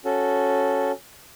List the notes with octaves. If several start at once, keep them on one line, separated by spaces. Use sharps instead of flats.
C#4 F#4 A4